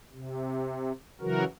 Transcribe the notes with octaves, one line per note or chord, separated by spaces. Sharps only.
C3
C#3 E3 F#3 F#4 A#4